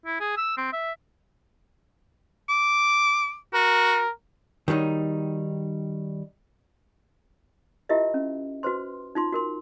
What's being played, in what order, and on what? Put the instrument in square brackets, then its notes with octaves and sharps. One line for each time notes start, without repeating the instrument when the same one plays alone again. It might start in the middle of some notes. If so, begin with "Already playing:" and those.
[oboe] E4
G#4
E6
C4
E5
[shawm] D6
[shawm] F#4 [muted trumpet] A#4
[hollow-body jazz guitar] D#3 F#3 G3 D#4
[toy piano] E4 F4 G4 A#4 D#5 E5
C#4
F#4 B4 C5 C6
D#4 F4 C6
F#4 A#4 C6